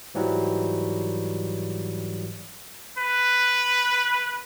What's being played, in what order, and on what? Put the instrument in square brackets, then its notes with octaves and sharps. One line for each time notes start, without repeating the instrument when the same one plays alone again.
[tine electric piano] G#2 E3 F#3 G3
[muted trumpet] B4